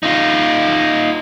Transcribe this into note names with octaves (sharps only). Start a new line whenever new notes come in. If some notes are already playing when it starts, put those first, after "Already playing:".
D#4 F4